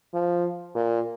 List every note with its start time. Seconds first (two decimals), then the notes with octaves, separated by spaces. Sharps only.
0.14 F3
0.75 A#2